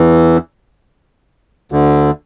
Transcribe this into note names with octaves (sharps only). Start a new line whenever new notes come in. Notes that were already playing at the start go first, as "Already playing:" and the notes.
Already playing: E2 E3
D2 D3